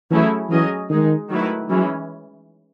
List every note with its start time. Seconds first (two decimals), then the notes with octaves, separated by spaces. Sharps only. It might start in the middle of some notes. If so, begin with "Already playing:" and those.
0.11 E3 F#3 A3 C#4 E4 G#4
0.50 E3 F#3 C#4 G#4 D#5
0.90 D#3 G#3 D#4 G#4
1.29 D#3 F#3 A3 E4 B4
1.69 E3 F#3 G#3 C#4